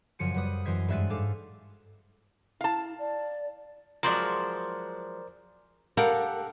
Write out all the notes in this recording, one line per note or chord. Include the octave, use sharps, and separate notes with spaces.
F#1 F#2 F3 C#7 D#7
F#2 G3 B4 D#6
F#2 E3 C5 D#5 G#6 B6
G2 G#3 E5 F#6 A6 D#7
G#2 A4 F5 D6 A6
E4 F5 A5
D5
F3 F#3 G#3 A#4 C5 D5
G4 A4 A#4 F5 F#5